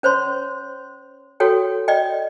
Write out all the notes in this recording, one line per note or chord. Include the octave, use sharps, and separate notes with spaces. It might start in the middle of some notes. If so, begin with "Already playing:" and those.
C#4 C5 C#5 C6
F#4 A4 C#5 G5
D5 D#5 G5